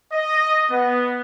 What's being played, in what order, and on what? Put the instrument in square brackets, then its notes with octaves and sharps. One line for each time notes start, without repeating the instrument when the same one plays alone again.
[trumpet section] D#5
B3